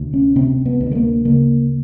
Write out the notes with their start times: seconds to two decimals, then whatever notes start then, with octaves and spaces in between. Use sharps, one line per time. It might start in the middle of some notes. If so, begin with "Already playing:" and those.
Already playing: D2 C3
0.14 C#4
0.36 C3 C4
0.66 B3
0.81 D2
0.91 A3
0.95 A#3
1.25 C#3 A#3